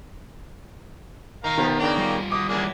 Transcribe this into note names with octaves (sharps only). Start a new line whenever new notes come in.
B2 D#3 A#4 F5 A#5
C3 D#3 F3 B3
C#3 A#3 D4 D5 G5 A#5
G3 F4
B2 D6 D#6
F#2 E3 A#3 D4 G#4